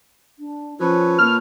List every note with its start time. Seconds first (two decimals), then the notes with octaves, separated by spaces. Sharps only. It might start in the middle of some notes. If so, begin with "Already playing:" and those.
0.39 D4
0.80 F3 C#4 A4 B4 C#5
1.18 A#2 F6